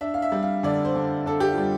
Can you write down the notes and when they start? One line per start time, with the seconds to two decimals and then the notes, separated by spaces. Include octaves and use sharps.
0.01 D4 E5
0.14 F5
0.22 E5
0.32 G3
0.43 F5
0.63 D3 D5
0.85 C5
0.95 D3
1.26 D4 A4
1.40 G4
1.52 F4
1.58 G3